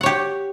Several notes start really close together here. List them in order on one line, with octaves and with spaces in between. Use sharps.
F#5 C#5 G4